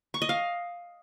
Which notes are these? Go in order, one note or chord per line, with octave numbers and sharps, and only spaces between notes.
C#6
D#5
F5